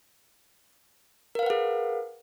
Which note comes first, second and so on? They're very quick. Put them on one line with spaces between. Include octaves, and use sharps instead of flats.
A#4 F5 B4 F#5 G#4